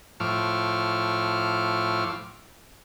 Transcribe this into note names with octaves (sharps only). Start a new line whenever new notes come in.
A2 F3 C#6 D6 E6 F6